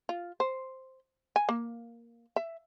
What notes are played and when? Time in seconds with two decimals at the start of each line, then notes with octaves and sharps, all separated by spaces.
0.09 F4
0.40 C5
1.36 G#5
1.49 A#3
2.36 E5